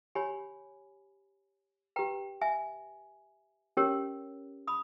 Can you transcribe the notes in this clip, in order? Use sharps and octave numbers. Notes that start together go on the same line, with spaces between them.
G4 C#5 G#5 B5
G4 B4 G5 A#5
E5 G#5
C#4 G4 A#4 C#5
B5 D#6